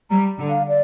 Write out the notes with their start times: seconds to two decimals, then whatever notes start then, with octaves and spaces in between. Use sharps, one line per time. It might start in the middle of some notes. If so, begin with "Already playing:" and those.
0.10 G3 A#5
0.39 D3
0.49 F5
0.68 D5